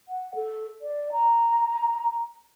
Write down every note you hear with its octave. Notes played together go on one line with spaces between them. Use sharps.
F#5
A4
D5
A#5